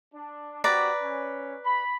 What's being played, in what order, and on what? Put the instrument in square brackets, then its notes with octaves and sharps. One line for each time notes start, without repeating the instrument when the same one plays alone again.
[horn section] D4
[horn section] C4 F#4 G4 [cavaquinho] B4 D5 A#5
[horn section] C#4
B5